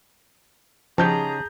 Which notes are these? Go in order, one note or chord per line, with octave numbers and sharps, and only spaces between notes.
C#3 F3 D#4 G4 G#4 A5 A#5 G6